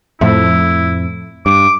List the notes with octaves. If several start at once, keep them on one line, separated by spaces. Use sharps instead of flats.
F2 A2 F3 A3 E4
G2 D6